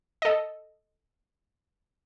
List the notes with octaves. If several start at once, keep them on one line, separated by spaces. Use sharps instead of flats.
A4 D#5